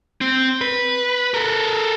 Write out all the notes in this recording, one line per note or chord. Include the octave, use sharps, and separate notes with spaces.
C4
B4
A4 A#4